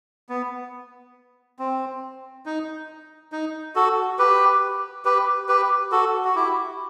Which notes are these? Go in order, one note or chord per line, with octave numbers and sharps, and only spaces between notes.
B3
C4
D#4
D#4
F#4 A4
G4 B4
G4 B4
G4 B4
F#4 A4
F#4
E4 G4